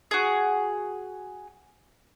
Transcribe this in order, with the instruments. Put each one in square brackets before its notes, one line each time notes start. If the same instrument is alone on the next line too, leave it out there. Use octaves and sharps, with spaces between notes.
[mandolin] F#4 G#4